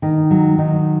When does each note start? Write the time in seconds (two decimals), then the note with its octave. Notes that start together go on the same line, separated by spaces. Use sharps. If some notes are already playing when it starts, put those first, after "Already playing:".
0.02 D#3
0.31 F#3
0.58 D#3